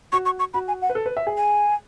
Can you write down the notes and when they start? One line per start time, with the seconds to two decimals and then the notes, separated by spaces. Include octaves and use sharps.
0.12 F#4 C#6
0.26 C#6
0.39 C#6
0.54 F#4 B5
0.68 G#5
0.82 F#5
0.89 B4
0.95 A4
1.06 B4
1.17 E5
1.27 G#4
1.37 G#5